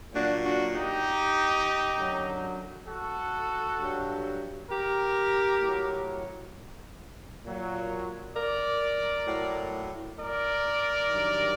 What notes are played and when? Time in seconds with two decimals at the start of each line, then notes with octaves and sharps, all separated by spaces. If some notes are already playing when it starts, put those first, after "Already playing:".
0.13 A#2 F#3 D4 F#4
0.43 D4 F#4
0.74 D#4 G4
1.95 F#2 D3 F#3
2.87 F#4 A4
3.78 G2 F#3
4.69 G4 A#4
5.61 A2 F#3
7.43 A#2 F#3
8.35 A#4 D5
9.26 A2 F#3
10.17 A#4 D5
11.08 G2 D#3 F#3